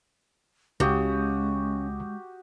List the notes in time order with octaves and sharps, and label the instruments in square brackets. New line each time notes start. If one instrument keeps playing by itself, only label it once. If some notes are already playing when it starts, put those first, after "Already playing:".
[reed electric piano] C#2 [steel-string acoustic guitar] C#3 [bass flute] G#3 [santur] F#4 G4 D#6